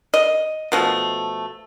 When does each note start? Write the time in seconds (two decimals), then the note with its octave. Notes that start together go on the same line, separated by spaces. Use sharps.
0.14 D#5
0.72 B2 F3 A3